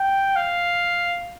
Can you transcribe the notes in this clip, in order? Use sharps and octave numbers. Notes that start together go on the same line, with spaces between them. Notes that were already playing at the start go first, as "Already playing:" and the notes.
Already playing: G5
F5